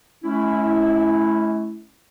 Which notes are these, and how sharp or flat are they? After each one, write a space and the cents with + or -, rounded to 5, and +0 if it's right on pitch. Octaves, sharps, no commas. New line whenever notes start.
A3 -45 C#4 +0 E4 +0